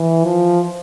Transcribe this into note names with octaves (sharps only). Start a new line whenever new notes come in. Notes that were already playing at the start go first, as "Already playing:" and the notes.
Already playing: E3
F3